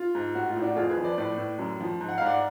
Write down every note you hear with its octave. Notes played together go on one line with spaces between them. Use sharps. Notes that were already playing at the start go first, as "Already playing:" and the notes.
Already playing: F4
G#2
A2 F#4
F4
A2
D4 F#4
F2 F4 G#4
G#4 B4
F3
B4 D5
A2 B4 D5
A2
F#2
F3
G#2
F#5
F5
G#2 D5 F#5